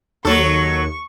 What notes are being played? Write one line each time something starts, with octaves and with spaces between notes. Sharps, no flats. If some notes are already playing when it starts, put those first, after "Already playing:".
D#2 F#3 A4 C#6